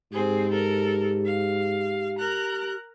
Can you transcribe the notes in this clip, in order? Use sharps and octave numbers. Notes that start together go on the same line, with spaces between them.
G#2 C4 G4 G#4
A4 A#4
F5
A#4 A#5 F#6